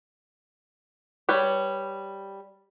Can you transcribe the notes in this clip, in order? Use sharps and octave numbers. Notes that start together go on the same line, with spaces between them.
G3 B4 C#5